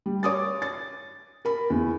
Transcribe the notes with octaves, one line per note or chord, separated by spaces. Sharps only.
G3
C#5 D6 D#6 A6
A6
A#4 B5
E2